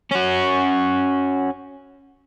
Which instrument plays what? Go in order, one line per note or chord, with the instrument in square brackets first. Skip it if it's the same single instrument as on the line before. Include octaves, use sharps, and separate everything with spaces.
[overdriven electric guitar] C#4 F#4